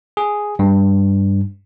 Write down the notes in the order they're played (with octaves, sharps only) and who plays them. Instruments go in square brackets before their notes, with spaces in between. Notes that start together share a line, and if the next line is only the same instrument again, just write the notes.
[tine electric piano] G#4
G2